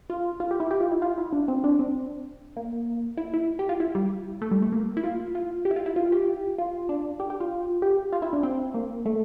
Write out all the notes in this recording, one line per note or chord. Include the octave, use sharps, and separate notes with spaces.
F4
F4
G4
E4
G4
F4
E4
F4
E4
D4
C4
D4
C4
A#3
E4
E4
G4
F4
E4
G3
A3
G3
A3
A#3
E4
F4
F4
G4
E4
F4
E4
F4
G4
F4
D4
G4
G4
F4
G4
F4
E4
D4
C4
A#3
A3